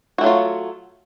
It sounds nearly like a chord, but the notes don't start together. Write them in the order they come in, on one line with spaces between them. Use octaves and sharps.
F#4 A3 F#3 F4